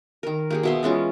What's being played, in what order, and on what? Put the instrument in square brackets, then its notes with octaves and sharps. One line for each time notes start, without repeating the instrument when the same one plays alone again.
[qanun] D#3 A#4
A#3 G4 G#4
B2 E5 C6
E3 G#3 C#4 F4